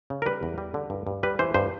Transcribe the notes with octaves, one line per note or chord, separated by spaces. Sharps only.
C#3
A#4
G3 B4
E2
G3
D3
G2
G2
G3 B4
E3 C5
G2 C5